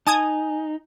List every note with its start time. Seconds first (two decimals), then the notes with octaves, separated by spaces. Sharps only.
0.07 D#4 G#5 A5 D#6 G#6